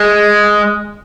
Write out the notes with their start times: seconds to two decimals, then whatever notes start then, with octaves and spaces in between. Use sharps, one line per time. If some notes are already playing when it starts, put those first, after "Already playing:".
Already playing: G#3